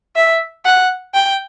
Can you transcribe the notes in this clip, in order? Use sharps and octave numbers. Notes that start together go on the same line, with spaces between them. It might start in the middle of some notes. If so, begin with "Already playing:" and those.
E5
F#5
G5